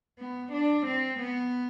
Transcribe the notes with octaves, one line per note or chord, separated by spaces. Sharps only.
B3
D4
C4
B3